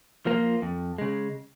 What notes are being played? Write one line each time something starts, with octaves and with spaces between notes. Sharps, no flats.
F3 A#3 F4
F2
C#3 G#3